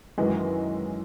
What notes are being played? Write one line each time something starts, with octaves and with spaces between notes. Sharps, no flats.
F#2 D#3 E3 F#3 G#3